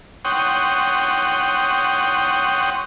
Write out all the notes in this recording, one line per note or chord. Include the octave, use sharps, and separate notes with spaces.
C#5 F#5 G5 C6 D#6